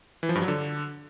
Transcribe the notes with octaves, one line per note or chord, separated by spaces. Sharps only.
E3
F3
G2
F#3
D3